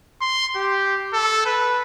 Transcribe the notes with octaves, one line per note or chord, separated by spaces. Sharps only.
C6
G4
A4
B4